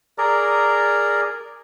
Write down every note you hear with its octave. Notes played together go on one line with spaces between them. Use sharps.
G#4 A#4 D5 A#5